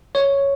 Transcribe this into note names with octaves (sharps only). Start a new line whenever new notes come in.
C#5